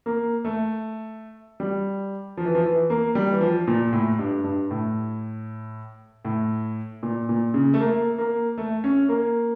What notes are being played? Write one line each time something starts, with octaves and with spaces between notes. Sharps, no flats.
A#3
A3
G3
F3
E3
F3
E3
A#3
G3
E3
F3
A#2
A2
G2
G2
A2
A2
A#2
A#2
C#3
A3
A#3
A#3
A3
C#4
A#3